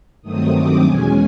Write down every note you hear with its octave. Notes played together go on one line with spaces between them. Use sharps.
G2 D#3 F#3 A3 C4 D#6
D6
E2 B2 G#3 C#4 G#5